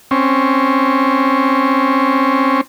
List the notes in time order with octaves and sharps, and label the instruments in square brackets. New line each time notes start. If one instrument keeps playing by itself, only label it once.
[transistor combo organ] C4 C#4